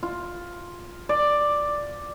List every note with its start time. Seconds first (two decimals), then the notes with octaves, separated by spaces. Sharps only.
0.03 F4
1.09 D5